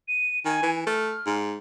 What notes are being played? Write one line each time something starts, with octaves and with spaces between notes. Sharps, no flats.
D#7
D#3 G#5
E3
A3 F6
G#2